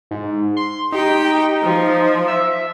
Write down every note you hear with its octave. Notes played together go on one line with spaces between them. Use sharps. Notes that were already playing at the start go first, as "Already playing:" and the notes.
G#2
C6
D#4 G4 G5
F3
E5